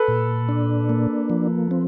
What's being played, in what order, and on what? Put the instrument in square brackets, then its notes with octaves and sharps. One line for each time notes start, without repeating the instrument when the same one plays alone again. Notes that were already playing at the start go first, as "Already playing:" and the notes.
Already playing: [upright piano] A4 B4
[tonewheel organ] A#2
D4
A#3
F3
C4